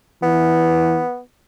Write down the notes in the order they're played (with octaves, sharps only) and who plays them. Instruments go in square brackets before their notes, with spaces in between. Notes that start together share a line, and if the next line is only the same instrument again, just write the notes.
[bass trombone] E3 [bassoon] B3